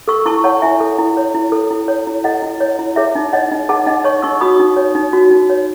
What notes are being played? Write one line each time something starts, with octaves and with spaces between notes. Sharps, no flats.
A4 C#6 E6
E4 A5 C#6
C#5 F#5 A5
E4 E5 G#5
A4
E4
C#5
E4
A4
E4
C#5
E4
A4 D#5 F#5
E4
C#5
E4
G#4 C#5 E5
D#4
C#5 D#5 F#5
D#4
G#4 F#5 A5
D#4 D#5 F#5
C#5 A5 C#6
D#4 C#6 E6
F#4 B5 D#6
D#4
C#5
D#4
F#4
D#4
C#5